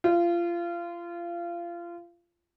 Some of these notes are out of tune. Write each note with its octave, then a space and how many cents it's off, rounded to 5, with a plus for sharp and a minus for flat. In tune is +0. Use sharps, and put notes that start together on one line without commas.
F4 -25